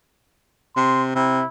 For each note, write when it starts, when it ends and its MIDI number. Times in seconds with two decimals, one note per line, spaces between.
0.76 1.11 48
0.76 1.04 84
1.15 1.42 48
1.15 1.48 64